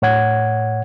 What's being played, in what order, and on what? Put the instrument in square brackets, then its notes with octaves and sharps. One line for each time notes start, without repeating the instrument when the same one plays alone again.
[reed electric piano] A2 C#5 F#5 G#6